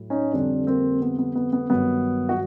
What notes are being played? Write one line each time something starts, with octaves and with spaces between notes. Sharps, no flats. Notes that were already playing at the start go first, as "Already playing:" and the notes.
Already playing: A2 F#3
C#4 D#4
F2 D3 G3 C4 D4
A#3 C4
B3
B3
B3
B3
G2 D#3 F#3 B3
F#4